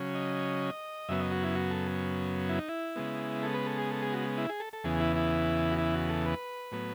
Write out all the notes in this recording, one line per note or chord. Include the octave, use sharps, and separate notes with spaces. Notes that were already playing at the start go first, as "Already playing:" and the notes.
Already playing: C#3 F#3 C#4
D#5
F#2 C#3 F#3 B3 E5
D#5
F#4
E4
F#4
A4
E4
D#4
E4
C#3 G#3 B3
A4
B4
A4
G#4
A4
G#4
F#4
E4
G#4
A4
A4
E2 C#3 E3 B3 G#4
E4
E4
F#4
E4
F#4
A4
B4
A2 F#3 B3